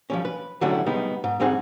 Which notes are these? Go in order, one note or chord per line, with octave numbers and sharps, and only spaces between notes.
F3 G3 C#4
B4
D3 F#3 G3 A3 C#4 E4
G3 G#3 B3 D#4
G#2
G#2 G3 C4 D#4 G#4 F#5